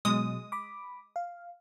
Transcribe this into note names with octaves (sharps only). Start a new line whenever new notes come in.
B2 F#3 G#3 D#6
B5 D6
F5